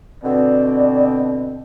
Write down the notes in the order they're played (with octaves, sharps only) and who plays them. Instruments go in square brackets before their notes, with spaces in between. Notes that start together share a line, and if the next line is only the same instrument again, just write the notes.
[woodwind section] B2 D3 C4 [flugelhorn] D5